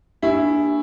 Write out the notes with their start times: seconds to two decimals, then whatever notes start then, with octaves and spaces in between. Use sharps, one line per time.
0.22 A#3 D4 E4 G4